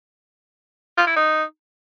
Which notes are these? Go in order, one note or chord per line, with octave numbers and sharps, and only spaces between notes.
F4
E4
D#4